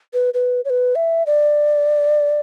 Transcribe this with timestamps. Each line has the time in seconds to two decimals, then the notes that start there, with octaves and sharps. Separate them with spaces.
0.14 B4
0.34 B4
0.65 C#5
0.70 B4
0.95 E5
1.26 D5